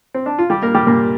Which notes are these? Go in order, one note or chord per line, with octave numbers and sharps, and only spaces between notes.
C4
D4
F4
G3 G4
A#3 A#4
G3 G4
A#2 A#3